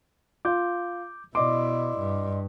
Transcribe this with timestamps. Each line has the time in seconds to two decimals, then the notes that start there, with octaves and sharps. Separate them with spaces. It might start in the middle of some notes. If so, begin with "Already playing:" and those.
0.45 F4 D6 G6
1.35 B2 E4 D5 D#5 C6 D6
1.98 G2